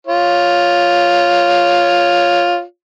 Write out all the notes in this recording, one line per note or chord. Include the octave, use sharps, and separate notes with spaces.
F4 C#5